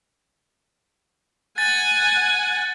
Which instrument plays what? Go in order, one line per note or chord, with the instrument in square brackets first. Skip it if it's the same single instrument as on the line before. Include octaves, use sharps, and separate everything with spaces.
[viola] F#5 G#5 [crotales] A6